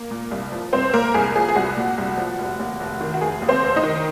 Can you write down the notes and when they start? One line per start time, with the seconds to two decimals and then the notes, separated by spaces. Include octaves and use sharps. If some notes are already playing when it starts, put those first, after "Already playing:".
Already playing: A#3
0.11 A#2
0.31 C2
0.52 F3
0.73 C2 C4 C5
0.93 A#2 A#3 A#4
1.14 C2 G#4
1.35 F3 G#4
1.49 G#4
1.56 C2 F#4
1.77 A#2
1.98 C2
2.18 F3
2.39 F1
2.59 D#2
2.80 F1
3.01 D#3
3.14 F#4
3.21 F1 G#4
3.42 D#2
3.49 C4 C5
3.62 F1
3.76 D#4 D#5
3.83 D#3